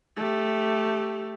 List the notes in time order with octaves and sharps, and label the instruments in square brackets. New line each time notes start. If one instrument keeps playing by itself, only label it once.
[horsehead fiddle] A3 G4